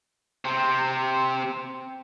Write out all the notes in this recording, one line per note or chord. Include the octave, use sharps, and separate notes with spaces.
C3 C4